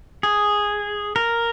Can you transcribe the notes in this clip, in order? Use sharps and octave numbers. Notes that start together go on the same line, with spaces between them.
G#4
A#4